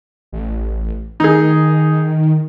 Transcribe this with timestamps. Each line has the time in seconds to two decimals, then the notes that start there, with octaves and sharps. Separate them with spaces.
0.32 A1
1.20 D#3 D#4 G#4